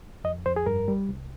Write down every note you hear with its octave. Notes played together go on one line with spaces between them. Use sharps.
F2 D#5
F2 C5
G#4
G2 A#4
G3
C2